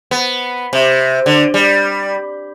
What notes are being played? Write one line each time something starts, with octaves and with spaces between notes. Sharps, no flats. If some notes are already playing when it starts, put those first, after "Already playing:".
B3
C3
D3
G3